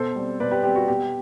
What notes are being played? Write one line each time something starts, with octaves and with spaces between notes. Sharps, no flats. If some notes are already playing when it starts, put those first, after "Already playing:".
Already playing: B2 A4 C5
G3 C4
B2 B4 D5
G4 B4
G3 C4 G4
F#4
B2 G4